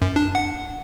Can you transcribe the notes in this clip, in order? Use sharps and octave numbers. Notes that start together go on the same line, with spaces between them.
F#2
D4
F#5